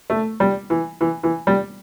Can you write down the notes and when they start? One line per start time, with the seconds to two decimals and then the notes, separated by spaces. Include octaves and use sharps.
0.10 A3
0.40 G3
0.70 E3
1.01 E3
1.23 E3
1.47 G3